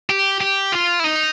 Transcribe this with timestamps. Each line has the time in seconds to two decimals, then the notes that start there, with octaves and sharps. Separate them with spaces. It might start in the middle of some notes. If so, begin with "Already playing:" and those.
0.10 G4
0.41 G4
0.72 F4
1.00 E4
1.04 D#4